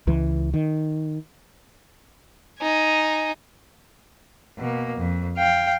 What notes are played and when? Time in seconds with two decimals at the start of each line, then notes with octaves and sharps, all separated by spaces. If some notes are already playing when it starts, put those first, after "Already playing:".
0.07 C#2 E3
0.54 D#3
2.60 D#4 G#5
4.59 B2 A#3
4.98 F2
5.38 F5 G5